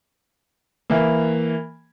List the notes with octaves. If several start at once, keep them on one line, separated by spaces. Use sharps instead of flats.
E3 A#3